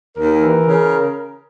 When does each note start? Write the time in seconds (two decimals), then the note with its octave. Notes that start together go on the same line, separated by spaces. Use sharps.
0.17 D#2 A#4
0.42 E3
0.67 C#3